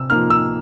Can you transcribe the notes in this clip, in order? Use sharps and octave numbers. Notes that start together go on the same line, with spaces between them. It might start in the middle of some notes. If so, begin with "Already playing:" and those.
Already playing: C3 E6
F3 A#3 D#4 F6
E6